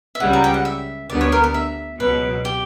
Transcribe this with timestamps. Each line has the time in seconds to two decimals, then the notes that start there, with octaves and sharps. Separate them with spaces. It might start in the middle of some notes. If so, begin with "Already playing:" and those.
0.15 E5
0.20 C#2 C#3 G3 F#5
0.33 A#5
0.44 G5
0.54 F#5
0.65 E5
1.09 D2 D3 G3 B3 D5
1.21 C#5
1.32 A#4
1.44 A#4
1.54 E5
1.99 C#2 B2 F#3 B4
2.45 G4